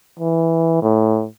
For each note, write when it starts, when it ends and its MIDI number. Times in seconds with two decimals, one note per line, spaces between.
0.19 0.78 52
0.82 1.26 45